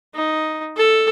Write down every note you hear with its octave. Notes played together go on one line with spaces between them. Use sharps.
D#4
A4